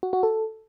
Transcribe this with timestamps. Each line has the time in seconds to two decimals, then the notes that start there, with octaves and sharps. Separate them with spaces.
0.03 F#4
0.13 F#4
0.23 A4